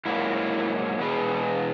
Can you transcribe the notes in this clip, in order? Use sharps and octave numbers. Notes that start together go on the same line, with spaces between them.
G#2 F#3 A#3 E4
E2 B2 G#3 B4